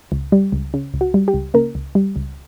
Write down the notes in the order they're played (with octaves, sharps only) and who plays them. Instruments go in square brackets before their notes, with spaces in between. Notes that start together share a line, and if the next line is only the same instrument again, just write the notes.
[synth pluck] C#2
G3
C#2
C#3
C#2
F#4
G3
G4
C#2
C#3 A#3 A#4
C#2
G3
C#2